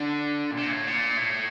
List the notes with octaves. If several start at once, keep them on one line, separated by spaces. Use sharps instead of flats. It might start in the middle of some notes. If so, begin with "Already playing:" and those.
Already playing: D3
A#2
C3
A#2
A2
A#2
A2